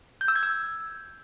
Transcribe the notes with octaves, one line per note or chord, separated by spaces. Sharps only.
G6
E6
G#6
E6